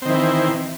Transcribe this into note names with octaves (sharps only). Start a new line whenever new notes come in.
D#3 E3 C4